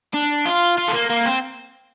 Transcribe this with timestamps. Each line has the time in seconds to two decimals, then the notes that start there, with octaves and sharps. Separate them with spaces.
0.14 D4
0.46 F4
0.78 F4
0.88 A3
0.94 A#3
1.10 A#3
1.26 C4